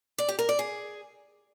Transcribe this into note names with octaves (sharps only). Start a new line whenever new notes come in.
D5
G4
A#4
D5
G#4